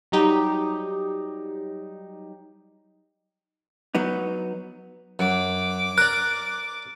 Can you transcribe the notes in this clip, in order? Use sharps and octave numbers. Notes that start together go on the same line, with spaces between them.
F#3 G3 D#4 G4
F#3 B3 D#4
F#2 D6
A#4 D5 F#6